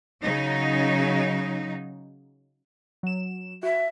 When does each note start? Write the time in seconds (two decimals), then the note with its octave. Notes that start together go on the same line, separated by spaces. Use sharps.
0.23 C#3 F#3 D#4
3.03 F#3 E7
3.63 F#4 E5